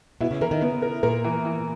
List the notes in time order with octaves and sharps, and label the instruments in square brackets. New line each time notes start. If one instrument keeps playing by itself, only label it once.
[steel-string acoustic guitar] B2 [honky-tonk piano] E4
[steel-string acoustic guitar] C#3
[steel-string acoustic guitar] E3 [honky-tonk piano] A#4
[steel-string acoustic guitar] D#3
[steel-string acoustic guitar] C#3 [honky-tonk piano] B3
[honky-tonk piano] A#4
[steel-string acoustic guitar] A#2 [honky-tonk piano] A#4
[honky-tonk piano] E3
E3